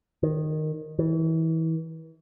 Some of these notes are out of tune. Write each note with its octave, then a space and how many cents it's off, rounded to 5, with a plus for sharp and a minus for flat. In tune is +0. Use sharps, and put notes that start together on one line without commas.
D#3 -10
E3 -30